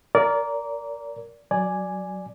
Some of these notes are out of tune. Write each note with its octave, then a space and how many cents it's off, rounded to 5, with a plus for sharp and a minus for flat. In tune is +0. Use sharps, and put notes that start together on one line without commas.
A#4 +0 D5 -25
F#3 +0 D5 +0 G#5 +0